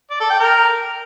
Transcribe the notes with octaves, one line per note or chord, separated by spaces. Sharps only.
D5
A4
G5
A#4